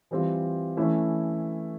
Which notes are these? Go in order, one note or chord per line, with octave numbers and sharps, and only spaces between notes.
E3 G3 C4 F4
E3 A3 C#4 E4